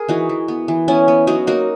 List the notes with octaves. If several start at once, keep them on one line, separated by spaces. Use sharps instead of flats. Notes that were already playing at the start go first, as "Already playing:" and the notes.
Already playing: G#4 A#4
E3 D#4 F#4
E3
B3
E3
B3 C#4 E4
B3
F#3 D#4 F#4
A#3 D#4 F#4